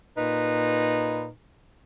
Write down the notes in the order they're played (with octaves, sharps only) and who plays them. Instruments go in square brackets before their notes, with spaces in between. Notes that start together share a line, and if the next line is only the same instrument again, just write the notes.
[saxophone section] A#2 D#4 B4